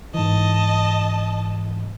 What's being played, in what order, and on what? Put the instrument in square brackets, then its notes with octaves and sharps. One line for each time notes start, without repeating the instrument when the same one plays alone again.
[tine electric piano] G#2 E3 [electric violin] D#5 A5